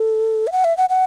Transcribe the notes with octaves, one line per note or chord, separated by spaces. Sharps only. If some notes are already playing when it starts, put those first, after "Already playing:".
Already playing: A4
E5
F#5
E5
F#5
F#5